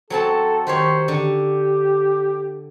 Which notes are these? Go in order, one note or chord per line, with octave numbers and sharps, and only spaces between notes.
F#3 C4 A4 A5
D#3 G4 C5 C#5
D3 G4